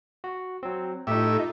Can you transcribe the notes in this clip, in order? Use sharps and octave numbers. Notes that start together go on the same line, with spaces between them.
F#4
F#3 C4
A2 D#4 F4 G4 A4 D#5 E5